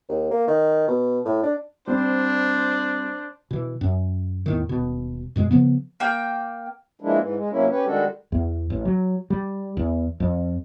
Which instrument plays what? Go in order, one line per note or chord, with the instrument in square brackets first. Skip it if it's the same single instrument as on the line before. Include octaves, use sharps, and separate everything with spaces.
[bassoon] D#2
A#3
D#3
B2
A2
D4
[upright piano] G3 C4 [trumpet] D4 [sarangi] C5
[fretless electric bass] B2 E3
F#2
E2 A2 D#3
D#1 B2
F#2 B2 G#3
C#3 F3 B3
[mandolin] A#3 G5
[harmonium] E3 F3 G#3 A#3 D4 E4
G#2 E3
G#3
C3 F#3 A#3 C#4 E4
C#4 G4 B4 C#5
D#3 G3 G#3 D4 F#4 A4
[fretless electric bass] E2
A1
F#3
G3
E2
F2